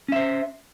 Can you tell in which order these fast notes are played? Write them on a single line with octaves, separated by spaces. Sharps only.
C#4 E5 C5